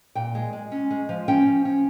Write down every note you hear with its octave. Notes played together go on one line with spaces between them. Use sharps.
A#2 G5
G#3
G#3
C#4
G#3
F3
C#4 G5
F3
C#4